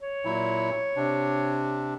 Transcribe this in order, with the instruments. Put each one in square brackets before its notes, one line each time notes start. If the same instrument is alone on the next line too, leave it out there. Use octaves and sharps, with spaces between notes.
[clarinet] C#5
[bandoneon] A#2 F#3 E4
C3 D4